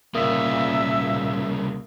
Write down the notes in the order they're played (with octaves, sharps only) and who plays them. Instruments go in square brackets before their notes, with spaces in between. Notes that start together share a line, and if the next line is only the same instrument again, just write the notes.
[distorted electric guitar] C2 C#3 [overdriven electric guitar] A#2 [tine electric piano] A#3 D#6 [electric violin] E5